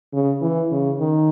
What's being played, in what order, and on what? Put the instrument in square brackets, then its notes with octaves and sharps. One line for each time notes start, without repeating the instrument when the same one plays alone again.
[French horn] C#3
E3
C#3
D#3